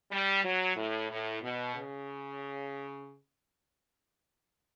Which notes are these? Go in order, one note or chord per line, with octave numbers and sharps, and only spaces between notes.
G3
F#3
A2
A2
B2
C#3